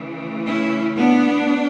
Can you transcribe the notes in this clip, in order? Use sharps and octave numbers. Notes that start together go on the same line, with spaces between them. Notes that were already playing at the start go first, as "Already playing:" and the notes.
Already playing: C#3 E3 A3
C#4 E4
B3 D4